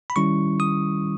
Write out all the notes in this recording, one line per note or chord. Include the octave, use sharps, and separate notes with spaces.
B5
D#3 G3 C#4 E4 C#6
D#6